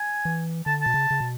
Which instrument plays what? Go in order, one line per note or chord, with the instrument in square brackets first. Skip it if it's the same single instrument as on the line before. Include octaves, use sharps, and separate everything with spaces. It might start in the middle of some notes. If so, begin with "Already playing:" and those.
Already playing: [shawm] G#5
[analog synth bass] E3
[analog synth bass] D3 [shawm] A5
[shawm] A5
[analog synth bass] B2
C#3
C#3
B2